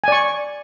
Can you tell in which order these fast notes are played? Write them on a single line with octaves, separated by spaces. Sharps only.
G#5 D5 C#6